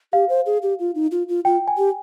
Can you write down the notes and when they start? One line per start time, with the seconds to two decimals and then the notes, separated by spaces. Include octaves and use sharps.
0.13 G4 F5
0.29 C5
0.46 G#4
0.62 G4
0.80 F4
0.95 D#4
1.11 F4
1.29 F4
1.45 F4 G5
1.68 G#5
1.78 G4